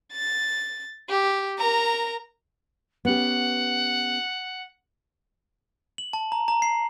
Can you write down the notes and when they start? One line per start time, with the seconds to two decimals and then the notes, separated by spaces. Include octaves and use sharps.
0.13 A6
1.09 G4
1.58 A#4 A#5
3.05 B3 C#4 G4 F#5
5.98 F#7
6.13 A5
6.32 A#5
6.48 A#5
6.62 C7